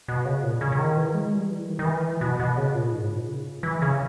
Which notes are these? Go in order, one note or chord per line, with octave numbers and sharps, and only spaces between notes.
B2
C#3
A#2
C#3
C#3
D#3
E3
G#3
G3
E3
D#3
D#3
E3
B2
B2
C#3
A#2
G#2
A#2
C#3
E3
C#3